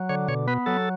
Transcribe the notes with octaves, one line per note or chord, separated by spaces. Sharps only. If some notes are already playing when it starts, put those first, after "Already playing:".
Already playing: F#3
D3 C#5
B2 C#5
B3 B4
F#3 A4